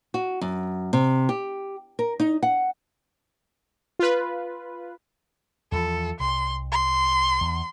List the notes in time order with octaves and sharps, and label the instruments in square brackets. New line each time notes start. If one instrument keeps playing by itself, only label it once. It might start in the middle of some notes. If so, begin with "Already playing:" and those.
[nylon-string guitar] F#4
F#2
C3
G4
A#4
D#4
F#5
[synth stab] F4 B4
[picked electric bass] E2 F3 [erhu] A4
[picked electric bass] C2 [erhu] C6
[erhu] C6
[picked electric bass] E2